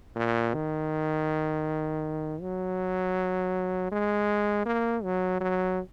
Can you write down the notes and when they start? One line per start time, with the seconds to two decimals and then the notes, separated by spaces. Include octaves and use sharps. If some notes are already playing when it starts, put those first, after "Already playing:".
0.16 A#2
0.54 D#3
2.41 F#3
3.92 G#3
4.66 A#3
5.04 F#3
5.41 F#3